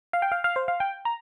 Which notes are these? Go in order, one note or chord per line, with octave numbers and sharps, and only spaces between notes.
F5
G5
F5
F5
C5
F5
G5
A#5